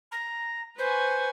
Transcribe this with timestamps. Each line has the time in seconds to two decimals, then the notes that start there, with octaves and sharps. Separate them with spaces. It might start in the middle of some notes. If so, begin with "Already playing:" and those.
0.11 A#5
0.78 B4 C5 G#5 C#6